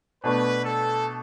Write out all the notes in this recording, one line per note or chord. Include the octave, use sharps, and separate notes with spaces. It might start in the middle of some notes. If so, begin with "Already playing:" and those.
B2 A3 D4 B4
A4